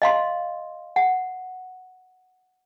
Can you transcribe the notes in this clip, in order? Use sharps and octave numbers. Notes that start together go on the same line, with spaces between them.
D#5 F5 C6
F#5